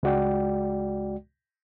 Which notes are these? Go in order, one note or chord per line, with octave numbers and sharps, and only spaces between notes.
C#2 G#3 F#4 D5 G5